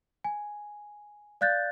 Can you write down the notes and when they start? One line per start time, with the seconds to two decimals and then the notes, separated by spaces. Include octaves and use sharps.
0.24 G#5
1.41 D5 F5 F#6 G6 A6